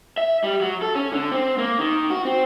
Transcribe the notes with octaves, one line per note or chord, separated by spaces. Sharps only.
E5
G3
F#3
A4
C#4
D3
C4
A#3
D#3
F#4
C4